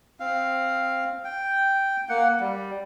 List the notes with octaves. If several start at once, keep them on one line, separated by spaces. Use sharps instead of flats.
C4 F5
G5
A#3 F#5
G3